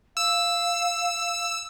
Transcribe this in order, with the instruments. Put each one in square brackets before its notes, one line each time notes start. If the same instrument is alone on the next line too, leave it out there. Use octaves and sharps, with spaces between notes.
[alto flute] F5 [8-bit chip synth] E6